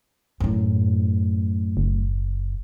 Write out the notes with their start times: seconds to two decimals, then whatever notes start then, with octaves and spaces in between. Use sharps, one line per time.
0.40 F#2 A2
1.77 F#1